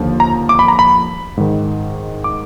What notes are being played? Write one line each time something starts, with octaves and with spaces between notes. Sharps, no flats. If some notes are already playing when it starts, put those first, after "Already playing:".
Already playing: D#2 D3 F3
A#5
D6
B5
A#5
B5
G#2 D#3
D6